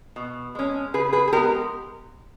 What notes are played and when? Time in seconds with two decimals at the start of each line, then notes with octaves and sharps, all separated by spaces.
0.16 B2
0.55 G#3 C#4
0.94 C#3 G#4 B4
1.13 G#4 B4
1.27 G#4
1.33 G#3 B3 G4 A#4